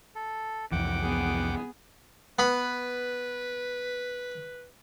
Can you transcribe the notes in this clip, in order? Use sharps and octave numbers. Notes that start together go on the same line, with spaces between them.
A4
C2 F2 E3 F#5 G5 D6
B3 G#4
B3 B4 B5